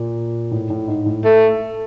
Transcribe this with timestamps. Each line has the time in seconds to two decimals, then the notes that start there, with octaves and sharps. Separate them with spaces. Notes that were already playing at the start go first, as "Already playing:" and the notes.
Already playing: A#2
0.51 A2
0.70 A2
0.88 G#2
1.06 A2
1.25 A3